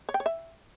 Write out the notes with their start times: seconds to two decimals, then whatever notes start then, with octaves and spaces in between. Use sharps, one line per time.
0.09 C#5
0.14 G5
0.20 C#5
0.26 E5